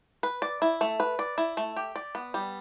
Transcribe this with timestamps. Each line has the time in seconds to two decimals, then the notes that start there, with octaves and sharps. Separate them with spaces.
0.23 B4
0.42 D5
0.62 E4
0.81 A3
1.00 B4
1.19 D5
1.38 E4
1.57 A3
1.77 G4
1.96 D5
2.15 B3
2.34 G3